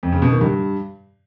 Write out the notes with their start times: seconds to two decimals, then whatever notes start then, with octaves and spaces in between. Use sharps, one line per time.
0.03 F2
0.12 C#3
0.22 B2
0.32 D#3
0.41 G2